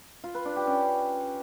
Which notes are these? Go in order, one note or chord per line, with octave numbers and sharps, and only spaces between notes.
F4
B4
D4
G4
C#4